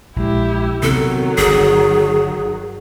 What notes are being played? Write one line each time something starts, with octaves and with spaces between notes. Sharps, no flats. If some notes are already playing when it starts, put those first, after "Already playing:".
A#1 G#3 E4 G4
C3 D#3 F#3 B3 A4
G1 G#4